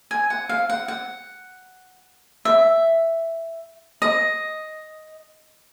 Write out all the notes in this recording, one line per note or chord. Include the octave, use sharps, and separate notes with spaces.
G#5
F#5
F5
F#5
F#5
E5
D#5